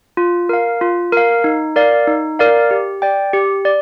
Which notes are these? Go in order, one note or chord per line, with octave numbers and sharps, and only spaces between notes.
F4
A#4 F5
F4
A#4 F5
D#4
A#4 D5 F5
D#4
A#4 D5 F5
G4
D5 G5
G4
D5